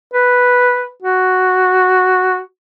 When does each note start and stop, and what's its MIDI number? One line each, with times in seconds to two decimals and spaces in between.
0.13 0.90 71
1.02 2.41 66